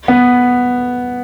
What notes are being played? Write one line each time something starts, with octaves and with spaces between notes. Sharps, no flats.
B3